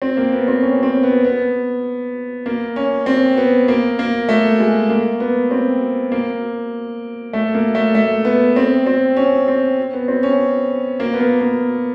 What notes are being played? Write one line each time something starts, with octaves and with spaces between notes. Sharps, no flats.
C4
A#3
B3
C4
C#4
C4
B3
B3
A#3
C#4
C4
B3
A#3
A#3
A3
G#3
A#3
B3
C4
A#3
A3
A#3
A3
A3
B3
C4
C4
C#4
C4
B3
C4
C#4
A#3
B3
A#3
A#3